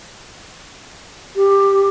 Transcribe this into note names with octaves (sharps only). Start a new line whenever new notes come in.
G4